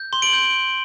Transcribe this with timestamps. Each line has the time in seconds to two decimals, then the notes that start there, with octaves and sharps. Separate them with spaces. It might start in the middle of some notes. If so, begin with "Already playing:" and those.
Already playing: G6
0.13 C6 G7
0.22 D7 F#7
0.33 G6